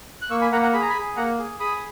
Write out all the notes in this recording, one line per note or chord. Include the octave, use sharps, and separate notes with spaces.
F#6
A#3 C#6 E6
G#5 B5
A#3 F#5 A#5
F#5 A#5
G#4 B5
A#5
G#5 B5
G#4
A#3 F#5 A#5
G#4
G#4 B5 D#6